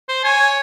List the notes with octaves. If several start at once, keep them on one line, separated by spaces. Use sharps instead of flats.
C5
C#5 G#5